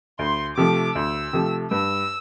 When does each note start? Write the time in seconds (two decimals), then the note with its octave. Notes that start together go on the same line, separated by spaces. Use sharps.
0.19 D2 C6
0.56 C3 F3 A3 D6
0.95 D2 E6
1.33 C3 F3 A3
1.71 G2 E6